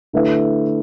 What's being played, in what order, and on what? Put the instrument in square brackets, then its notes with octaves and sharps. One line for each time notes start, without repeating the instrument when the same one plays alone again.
[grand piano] D3 A3 E4 B4 E5